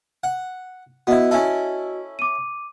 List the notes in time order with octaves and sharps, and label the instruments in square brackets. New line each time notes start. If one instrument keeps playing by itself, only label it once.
[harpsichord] F#5
[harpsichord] B3 E4 [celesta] F#4 D#5
[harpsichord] C#4 E4 A4
[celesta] D6 D#7